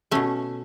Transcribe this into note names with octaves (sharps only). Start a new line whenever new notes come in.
B2 A3 C#4